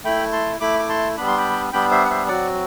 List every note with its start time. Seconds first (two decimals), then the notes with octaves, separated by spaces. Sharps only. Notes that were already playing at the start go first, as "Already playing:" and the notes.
0.04 A3 E4 G5 B5
0.32 A5 C6
0.60 A3 E4 B5 D6
0.79 D6
0.89 A5 C6
1.17 G3 B3 D4 B5
1.27 C6
1.37 G5 B5
1.72 G3 B3 D4 G5 B5
1.91 C5 E5
2.05 F#5
2.10 C5 E5
2.28 F#3 C4 F#4 D5 F#5